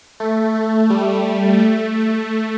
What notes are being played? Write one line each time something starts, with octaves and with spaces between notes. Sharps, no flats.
A3
A3
G3
A3